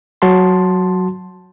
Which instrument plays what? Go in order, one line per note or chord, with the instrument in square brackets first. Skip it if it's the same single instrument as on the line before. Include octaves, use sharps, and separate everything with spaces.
[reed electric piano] F#3 F#4 A5 C6